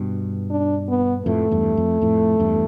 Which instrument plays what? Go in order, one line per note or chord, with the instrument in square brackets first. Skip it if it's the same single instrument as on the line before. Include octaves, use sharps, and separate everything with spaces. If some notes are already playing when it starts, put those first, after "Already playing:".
Already playing: [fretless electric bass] G2 B2
[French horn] D4
B3
[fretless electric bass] F2 A2 [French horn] A3
[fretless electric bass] E2 G2
F2
F2 A2
E2 G2